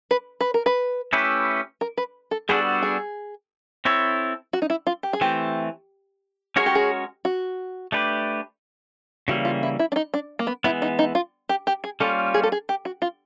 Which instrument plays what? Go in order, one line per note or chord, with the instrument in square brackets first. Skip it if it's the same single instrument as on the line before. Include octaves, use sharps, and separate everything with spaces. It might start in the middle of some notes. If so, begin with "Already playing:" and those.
[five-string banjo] B4
B4
A#4
B4
[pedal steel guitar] A3 C#4 E4 G4 B4
[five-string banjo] A#4
B4
A4
[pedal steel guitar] G3 B3 D4 F#4 A4 [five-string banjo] G#4
[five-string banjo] G#4
[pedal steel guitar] C4 E4 A4 C#5
[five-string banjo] F#4
D#4
E4
F4
G4
G#4
[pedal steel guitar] E3 A3 C4 [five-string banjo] G4
[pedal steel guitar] G#3 C#4 F#4 A#4 C#5 [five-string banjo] G#4
[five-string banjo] G4
G#4
F#4
[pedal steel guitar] A3 D4 G4 B4
[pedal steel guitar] C#3 E3 G3 A#3 [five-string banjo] F#4
[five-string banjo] F4
E4
E4
D4
D#4
D4
A#3
B3
[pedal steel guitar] E3 G#3 B3 [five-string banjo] E4
[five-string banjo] D#4
D#4
F4
G4
G4
G#4
[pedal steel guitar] G3 A#3 C#4 F4 [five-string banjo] A4
[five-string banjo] G#4
A4
G#4
G4
F#4
F4